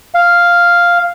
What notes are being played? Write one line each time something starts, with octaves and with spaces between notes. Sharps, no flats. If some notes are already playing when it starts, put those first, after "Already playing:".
F5